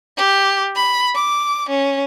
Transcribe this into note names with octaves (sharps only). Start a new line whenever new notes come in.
G4
B5
D6
C#4